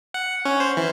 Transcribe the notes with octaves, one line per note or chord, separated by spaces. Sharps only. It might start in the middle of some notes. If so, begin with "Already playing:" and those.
F#5
C#4
C5
E3